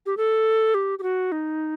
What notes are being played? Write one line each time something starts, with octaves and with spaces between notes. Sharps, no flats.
G4
A4
G4
G4
F#4
D#4